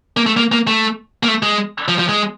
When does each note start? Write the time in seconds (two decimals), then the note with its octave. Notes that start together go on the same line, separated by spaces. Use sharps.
0.17 A#3
0.26 A3
0.37 A#3
0.52 A#3
0.67 A3
1.23 A#3
1.28 A3
1.43 G#3
1.88 F3
1.99 F3
2.09 G#3